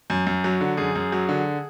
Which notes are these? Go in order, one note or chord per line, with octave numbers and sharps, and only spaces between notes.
F#2
F#2
F#3
D3
F#2 G#4
F#2
F#3
D3